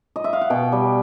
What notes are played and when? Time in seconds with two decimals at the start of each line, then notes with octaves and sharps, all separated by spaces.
0.16 D#5
0.24 E5
0.33 F5
0.41 F#5
0.50 B2 G5
0.72 G3